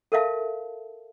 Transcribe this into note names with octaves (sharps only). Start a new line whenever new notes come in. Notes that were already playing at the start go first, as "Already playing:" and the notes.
A4 A#4 E5 F5 A5